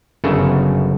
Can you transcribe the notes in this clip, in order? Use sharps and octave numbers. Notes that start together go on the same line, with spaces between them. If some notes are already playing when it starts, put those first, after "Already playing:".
G1 F#2 C#3 A4 A5